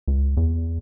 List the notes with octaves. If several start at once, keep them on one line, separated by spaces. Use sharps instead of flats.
C#2
E2